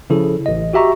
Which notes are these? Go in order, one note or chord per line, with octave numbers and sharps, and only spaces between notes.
C#3 F3 E4 A4
A1 D#5
F#4 G4 E5 A#5 C#6